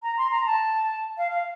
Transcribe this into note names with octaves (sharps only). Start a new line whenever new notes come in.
A#5
C6
A#5
A5
F5
F5